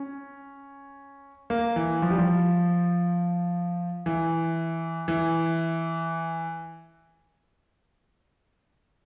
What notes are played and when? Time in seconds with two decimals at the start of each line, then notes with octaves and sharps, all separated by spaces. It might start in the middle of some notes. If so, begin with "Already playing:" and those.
Already playing: C#4
1.50 A#3
1.76 E3
2.02 F3
2.10 G3
2.18 F3
4.06 E3
5.08 E3